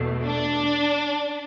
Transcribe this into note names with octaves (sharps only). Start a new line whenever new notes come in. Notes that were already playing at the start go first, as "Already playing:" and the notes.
Already playing: E2 B2 A3
D4